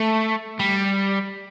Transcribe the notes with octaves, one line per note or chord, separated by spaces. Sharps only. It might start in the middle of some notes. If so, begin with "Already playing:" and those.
Already playing: A3
G3